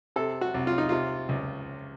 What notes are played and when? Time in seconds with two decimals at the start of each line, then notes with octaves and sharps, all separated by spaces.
0.16 C3 A4
0.41 F#4
0.54 C2
0.67 F4
0.78 D#4
0.89 C3 F4
1.29 C#2